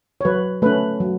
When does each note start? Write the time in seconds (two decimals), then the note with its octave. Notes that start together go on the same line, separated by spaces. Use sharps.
0.21 C#5
0.25 F#3 B4
0.62 A3 C#4 B4
1.00 F#3